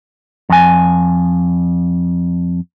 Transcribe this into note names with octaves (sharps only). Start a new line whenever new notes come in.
F2 G#5